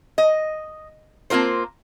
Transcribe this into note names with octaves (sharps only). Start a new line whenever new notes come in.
D#5
A#3 C4 F4 A#4 C5